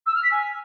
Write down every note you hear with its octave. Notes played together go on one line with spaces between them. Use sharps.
E6
F6
B6
G#5